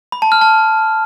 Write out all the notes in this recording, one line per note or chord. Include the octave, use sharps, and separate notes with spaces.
B5
A5
F6
A5